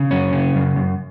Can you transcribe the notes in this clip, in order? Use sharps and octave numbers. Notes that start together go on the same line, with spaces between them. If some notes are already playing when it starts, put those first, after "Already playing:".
Already playing: C#3
F#2 C#4
C#3
F#2
F#2